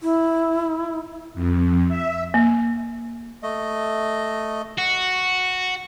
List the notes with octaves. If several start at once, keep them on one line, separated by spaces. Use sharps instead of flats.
E4
F2
E5
A#3
A3 D#5
F#4